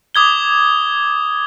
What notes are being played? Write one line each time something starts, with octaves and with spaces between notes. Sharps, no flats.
D6 D#6 G#6 G7